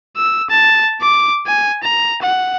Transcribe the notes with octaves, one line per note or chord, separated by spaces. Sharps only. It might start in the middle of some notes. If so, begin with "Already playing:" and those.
E6
A5
D6
G#5
A#5
F#5